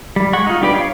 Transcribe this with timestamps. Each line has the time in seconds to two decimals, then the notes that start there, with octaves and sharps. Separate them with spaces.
0.16 G3
0.33 G#3 F#5 C#6
0.46 D#4 F4
0.61 G3 D4 G4 B4 D5
0.74 C#5 F5